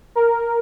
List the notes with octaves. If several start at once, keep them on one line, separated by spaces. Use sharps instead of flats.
A#4